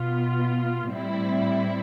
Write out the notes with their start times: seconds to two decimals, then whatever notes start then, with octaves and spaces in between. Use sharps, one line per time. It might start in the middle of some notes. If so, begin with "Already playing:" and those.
Already playing: B2 B3 F4
0.89 A2 G3 C4 E4